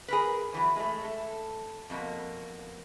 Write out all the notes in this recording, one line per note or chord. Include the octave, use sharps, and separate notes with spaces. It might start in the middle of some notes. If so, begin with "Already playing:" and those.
G#4 A#4 B4
E2 E3 F#3
G#3 A3
A4
F2 B2 A#3